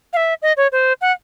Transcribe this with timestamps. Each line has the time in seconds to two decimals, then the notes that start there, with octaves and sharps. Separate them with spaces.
0.13 F5
0.17 E5
0.42 D#5
0.57 C#5
0.72 C5
1.01 F#5